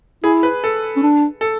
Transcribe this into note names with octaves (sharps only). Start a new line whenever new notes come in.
E4 G#4
B4
A4
C#4
D4
A4